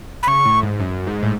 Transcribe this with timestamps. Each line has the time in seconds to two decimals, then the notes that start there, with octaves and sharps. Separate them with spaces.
0.23 B5
0.27 C#3 C#6
0.45 A2
0.63 G#2
0.80 F#2
1.07 G#2
1.23 A2